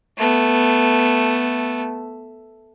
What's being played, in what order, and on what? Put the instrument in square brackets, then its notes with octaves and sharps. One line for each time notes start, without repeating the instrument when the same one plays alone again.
[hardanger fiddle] A3 B3